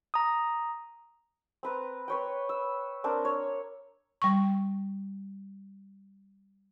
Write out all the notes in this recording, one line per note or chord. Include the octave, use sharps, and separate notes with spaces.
A#5 D#6
C4 B4 A#5
B4 C#5 G5
E6
C4 D4 A#4
C#5
G3 C#6